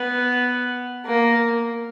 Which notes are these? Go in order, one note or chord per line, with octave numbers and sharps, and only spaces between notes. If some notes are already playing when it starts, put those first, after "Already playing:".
Already playing: B3
A#3